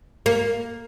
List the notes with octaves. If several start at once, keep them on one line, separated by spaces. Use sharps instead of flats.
A#3